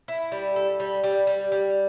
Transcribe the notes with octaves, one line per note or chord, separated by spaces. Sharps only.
E4
G3
A4
G3
G3
G3
G3